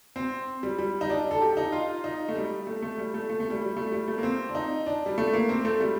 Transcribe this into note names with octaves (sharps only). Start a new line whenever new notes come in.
C4
G3
G3
D#4
D4
A4
G4
D#4
F4
D#4
A3
G3
A3
A3
G3
A3
A3
A3
G3
G3
A3
G3
A3
A#3
C4
D4
D#4
D4
G3
A3
A#3
C4
A3
G3